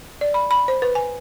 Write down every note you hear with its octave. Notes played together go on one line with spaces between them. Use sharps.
D5
B5
B5
C5
B4
G#5